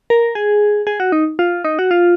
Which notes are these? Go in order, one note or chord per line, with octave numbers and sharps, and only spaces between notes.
A#4
G#4
G#4
F#4
D#4
F4
D#4
F#4
F4